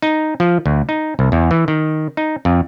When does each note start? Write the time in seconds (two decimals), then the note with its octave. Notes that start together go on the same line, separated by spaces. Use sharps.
0.02 D#4
0.40 F3
0.66 D2
0.89 D#4
1.19 C2
1.32 E2
1.51 E3
1.68 D#3
2.17 D#4
2.45 F2